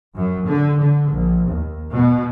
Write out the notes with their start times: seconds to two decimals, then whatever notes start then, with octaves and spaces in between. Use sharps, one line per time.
0.15 F#2
0.47 D3
0.81 D3
1.11 A#1
1.50 D#2
1.93 B2